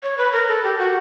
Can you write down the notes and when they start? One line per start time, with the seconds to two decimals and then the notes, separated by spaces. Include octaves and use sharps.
0.03 C#5
0.18 B4
0.33 A#4
0.48 A4
0.64 G4
0.79 F#4